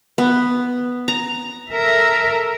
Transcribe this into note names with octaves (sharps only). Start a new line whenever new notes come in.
B3
A#5
A4 A#4 E5